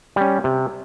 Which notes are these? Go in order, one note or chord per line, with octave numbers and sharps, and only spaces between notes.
G3 C#4
C3